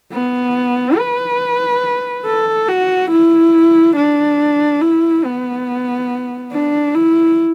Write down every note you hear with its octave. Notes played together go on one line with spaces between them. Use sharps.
B3
B4
A4
F#4
E4
D4
E4
B3
D4
E4